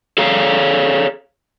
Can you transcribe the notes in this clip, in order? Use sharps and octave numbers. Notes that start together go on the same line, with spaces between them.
G#4 A4 C#5 F5 A#5